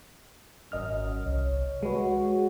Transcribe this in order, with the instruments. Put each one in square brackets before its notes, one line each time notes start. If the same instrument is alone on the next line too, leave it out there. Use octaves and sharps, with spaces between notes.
[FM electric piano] G#1 D#5 F6 [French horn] F#2
[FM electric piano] C2 [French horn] C#5
[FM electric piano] G#3 B4 C#5 [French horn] F#4